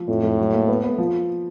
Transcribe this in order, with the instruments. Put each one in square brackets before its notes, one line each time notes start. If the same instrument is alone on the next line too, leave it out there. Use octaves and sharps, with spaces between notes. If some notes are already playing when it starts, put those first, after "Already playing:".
Already playing: [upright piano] F3
[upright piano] F2 [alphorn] A2
[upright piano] F2
F#3
A#3
B3
B3
F3